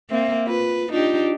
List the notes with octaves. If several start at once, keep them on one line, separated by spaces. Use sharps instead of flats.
A#3 C4 E5
F4 B4
D4 D#4 F4 G4